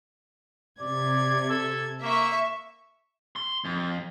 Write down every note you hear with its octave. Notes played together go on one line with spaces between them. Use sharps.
C3 D5 G#6
A4
A#3 E5 C#6
C6
F2